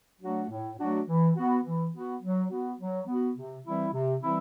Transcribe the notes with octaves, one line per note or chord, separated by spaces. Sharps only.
F#3 A3 D4 F#4
A2
F#3 A3 D4 F#4
E3
B3 F#4
E3
B3 F#4
F#3
B3 F#4
F#3
B3 F#4
C3
E3 G3 C4 E4
C3
E3 G3 C4 E4